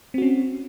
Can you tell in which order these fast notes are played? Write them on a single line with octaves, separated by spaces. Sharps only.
C4 F#4 C#4